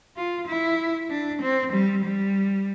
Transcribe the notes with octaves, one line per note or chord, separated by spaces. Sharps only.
F4
E4
D4
C4
G3
G3